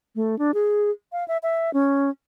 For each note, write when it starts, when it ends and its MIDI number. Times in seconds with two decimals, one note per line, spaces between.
0.15 0.38 57
0.39 0.51 62
0.54 0.90 68
1.12 1.26 77
1.28 1.38 76
1.43 1.73 76
1.74 2.10 61